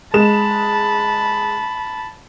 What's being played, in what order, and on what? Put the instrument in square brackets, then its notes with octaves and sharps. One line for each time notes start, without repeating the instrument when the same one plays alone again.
[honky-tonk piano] G#3 E7 [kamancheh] A5 B5